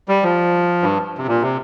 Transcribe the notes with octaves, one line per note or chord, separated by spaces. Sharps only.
G3
F3
G2
C3
A#2
C3